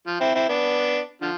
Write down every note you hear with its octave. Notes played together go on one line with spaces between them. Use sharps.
F3
C4 E4
C4 E4
B3 D4
D3 F3